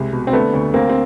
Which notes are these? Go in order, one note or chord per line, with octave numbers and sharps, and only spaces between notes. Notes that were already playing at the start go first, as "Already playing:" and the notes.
Already playing: C2 G#3
B2
C4
D3 A3 B3
D2
D2 A#3 C4
C4